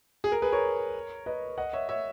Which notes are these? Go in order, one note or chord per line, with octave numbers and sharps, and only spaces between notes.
G#4
A#4
G#4 B4
A#4 C#5
B4 D#5
D#5 F#5
C#5 E5
C#5 E5